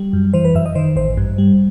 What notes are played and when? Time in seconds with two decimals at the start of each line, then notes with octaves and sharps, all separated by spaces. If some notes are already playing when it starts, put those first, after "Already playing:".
Already playing: G3
0.13 F#2
0.34 E3 C5
0.45 B4
0.55 F#2 E5
0.66 D#5
0.75 D#3 C5
0.96 A1 C5
1.17 G2
1.38 G3